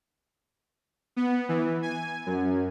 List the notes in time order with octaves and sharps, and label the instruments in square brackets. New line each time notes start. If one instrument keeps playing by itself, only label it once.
[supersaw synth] B3
E3
G#5
F#2